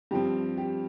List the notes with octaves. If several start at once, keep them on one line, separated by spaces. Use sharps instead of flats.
G2 F3 C4 G4
G4